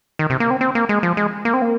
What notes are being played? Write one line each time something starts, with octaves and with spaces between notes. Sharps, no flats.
D#3
C3
A#3
C4
C4
A#3
G#3
F3
G#3
A#3
C4
A#3